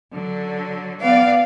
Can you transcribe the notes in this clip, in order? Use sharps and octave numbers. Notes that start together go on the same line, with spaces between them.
D3 F#3
B3 D5 F5